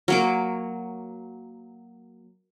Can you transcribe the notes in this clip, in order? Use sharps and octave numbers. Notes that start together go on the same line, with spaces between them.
F#3 A#3 D6